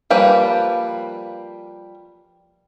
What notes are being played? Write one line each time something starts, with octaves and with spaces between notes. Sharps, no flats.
F3 G3 A#3 G4 B4